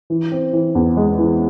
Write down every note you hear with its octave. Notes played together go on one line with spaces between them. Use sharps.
E3
C4
E3
E2
G#3
E3